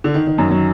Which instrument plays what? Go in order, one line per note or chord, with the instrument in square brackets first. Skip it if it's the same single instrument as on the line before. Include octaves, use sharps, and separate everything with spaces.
[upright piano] D3
D#3
D#3
F#2 F#3
F#3